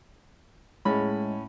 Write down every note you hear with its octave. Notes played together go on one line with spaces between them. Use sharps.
A2 G#3 C#4 B5